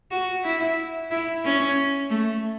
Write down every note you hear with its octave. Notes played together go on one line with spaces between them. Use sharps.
F#4
E4
E4
C#4
A3